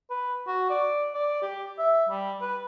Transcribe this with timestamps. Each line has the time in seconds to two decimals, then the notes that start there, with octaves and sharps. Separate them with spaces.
0.10 B4
0.47 F#4
0.70 D5
1.15 D5
1.42 G4
1.79 E5
2.09 G3
2.42 B4